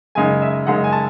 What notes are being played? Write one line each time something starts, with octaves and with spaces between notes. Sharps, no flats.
F#2 C#3 G#3 D#4 G#5
E5
F#2 C#3 G#3 D#4 F#5
G#5
A5